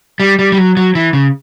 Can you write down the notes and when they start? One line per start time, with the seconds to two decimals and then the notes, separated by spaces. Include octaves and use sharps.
0.20 G3
0.39 G3
0.52 G3
0.58 F#3
0.77 F#3
0.95 E3
1.13 C#3